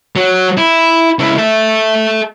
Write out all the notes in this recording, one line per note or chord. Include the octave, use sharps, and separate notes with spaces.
F#3
E4
C#2 E4
A4 E5